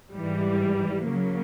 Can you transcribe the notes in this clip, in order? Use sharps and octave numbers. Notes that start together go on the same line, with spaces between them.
G#2 E3 G3
C#3 F#3 A#3